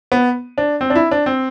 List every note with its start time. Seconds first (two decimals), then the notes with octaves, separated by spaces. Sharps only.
0.12 B3
0.58 D4
0.81 C4
0.90 D4
0.95 E4
1.11 D4
1.26 C4